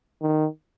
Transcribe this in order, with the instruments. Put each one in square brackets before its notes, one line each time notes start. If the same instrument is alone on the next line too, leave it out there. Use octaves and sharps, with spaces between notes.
[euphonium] D#3